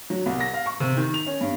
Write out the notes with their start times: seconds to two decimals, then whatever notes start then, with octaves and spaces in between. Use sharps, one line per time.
0.10 F#3
0.26 C2
0.40 A#6
0.54 F5
0.66 C#6
0.80 C3
0.97 D#3
1.14 F7
1.26 C#4
1.41 G2